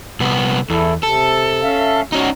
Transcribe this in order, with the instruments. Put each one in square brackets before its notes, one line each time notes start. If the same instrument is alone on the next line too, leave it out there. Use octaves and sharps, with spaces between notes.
[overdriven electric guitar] C2 B3
[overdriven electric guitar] E2 [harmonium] E4 A4
[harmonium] C3 [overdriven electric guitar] A4
[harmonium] C#4 E5 F5
[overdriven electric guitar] C#4 D#4 [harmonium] F#4